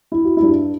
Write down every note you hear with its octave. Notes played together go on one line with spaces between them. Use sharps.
E4
F#4
G2 E4